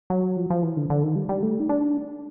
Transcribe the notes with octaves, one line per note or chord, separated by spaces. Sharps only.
F#3
F3
F3
E3
D3
D3
D#3
G3
G3
A3
D#4
D4